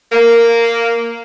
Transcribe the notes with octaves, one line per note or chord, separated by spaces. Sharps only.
A#3